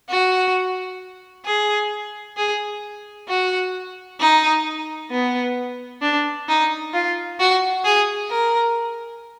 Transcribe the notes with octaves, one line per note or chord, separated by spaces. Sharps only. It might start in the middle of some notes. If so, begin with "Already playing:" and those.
F#4
G#4
G#4
F#4
D#4
B3
D4
D#4
F4
F#4
G#4
A#4